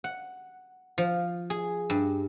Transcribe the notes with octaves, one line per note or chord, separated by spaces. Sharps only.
F#5
F3
G#4
G2